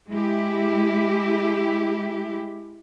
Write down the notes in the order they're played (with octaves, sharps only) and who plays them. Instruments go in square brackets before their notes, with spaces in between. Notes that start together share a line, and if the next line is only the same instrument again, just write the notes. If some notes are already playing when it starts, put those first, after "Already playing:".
[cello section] G#3 E4 G4